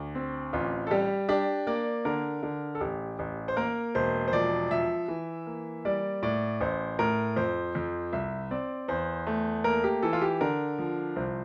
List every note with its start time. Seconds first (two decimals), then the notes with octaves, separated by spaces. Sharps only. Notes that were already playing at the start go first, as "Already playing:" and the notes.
Already playing: D2
0.15 C4
0.53 A1 F4
0.87 A4
0.91 G3 G4
1.29 D4 G4
1.67 A#3 D5
2.05 D3 A#4
2.43 D3
2.75 A4
2.81 A1 G4
3.19 A1
3.48 C5
3.57 A#3 A#4
3.95 E1 C5
4.28 C5
4.33 F3 D5
4.71 F3 E5
5.08 E3
5.47 A#3
5.85 G3 D5
6.23 A2 D5
6.61 A1 C5
6.99 A2 A#4
7.36 F2 C5
7.75 F2
8.13 C2 E5
8.51 C4 D5
8.88 E2 C5
9.27 A3
9.64 A#3 A#4
9.84 G4
10.02 E3 A4
10.13 F4
10.22 G4
10.41 D3 A#4
10.79 F3
11.16 C2 C5